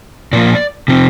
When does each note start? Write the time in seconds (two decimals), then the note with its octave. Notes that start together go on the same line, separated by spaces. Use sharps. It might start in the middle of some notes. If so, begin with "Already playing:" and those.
0.33 A#2 F3 A#3 F4 D5
0.88 C3 F3 C4